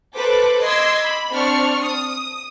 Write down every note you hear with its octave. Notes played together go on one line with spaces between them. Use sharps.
A4 B4 C5 D6
D#5 C6 D6 E6 G#6
B5
C4 D4 C#6 F6 C#7
D#6